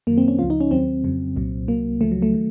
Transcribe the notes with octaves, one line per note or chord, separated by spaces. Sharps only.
F#2 D#3 F#3 A#3
C4
C#4
C#2 C#3 F3 F4
D#4
C#4
D#2 D#3 F#3 C4
F2 C#3 F#3
C2 A#2 F#3
C2 C3 F#3 A#3
C#2 C#3 F3 A3
F#3
A3
D#3 F#3